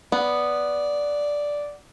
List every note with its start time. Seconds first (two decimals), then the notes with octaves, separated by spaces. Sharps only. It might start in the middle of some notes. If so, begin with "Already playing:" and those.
0.12 B3 D5